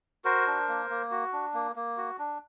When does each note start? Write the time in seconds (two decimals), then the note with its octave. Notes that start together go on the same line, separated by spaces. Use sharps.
0.24 F#4 A#4 C5
0.47 D4
0.68 A#3
0.90 A#3
1.11 F#4
1.33 D4
1.54 A#3
1.76 A#3
1.97 F#4
2.19 D4